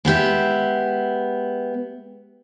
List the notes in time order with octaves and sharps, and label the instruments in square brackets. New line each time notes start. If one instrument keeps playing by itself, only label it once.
[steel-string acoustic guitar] G#3 B3 G4 E5